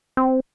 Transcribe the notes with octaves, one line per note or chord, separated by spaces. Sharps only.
C4